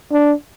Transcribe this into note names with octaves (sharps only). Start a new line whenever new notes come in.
D4